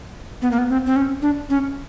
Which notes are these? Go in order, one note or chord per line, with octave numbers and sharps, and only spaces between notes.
B3
A#3
B3
C4
C4
C#4
D4
C#4